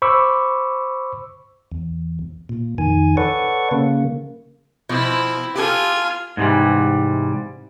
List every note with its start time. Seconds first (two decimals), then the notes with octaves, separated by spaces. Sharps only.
0.02 C5 B5 C#6 D6 E6
1.72 E2
2.49 A#2
2.78 F2 D#3 G#5
3.17 A4 B4 C#5 D5 F#5 C#6
3.71 C#3 A#3
4.89 B2 F3 C4 E4
5.55 F4 G4 A4 G#5
6.37 G#2 C3 E3 G3